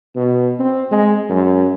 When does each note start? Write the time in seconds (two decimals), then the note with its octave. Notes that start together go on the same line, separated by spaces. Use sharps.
0.16 B2
0.59 C4
0.91 G#3
1.29 F#2